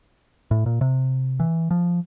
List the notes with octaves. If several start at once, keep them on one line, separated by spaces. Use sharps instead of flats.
A2
A#2
C3
E3
F3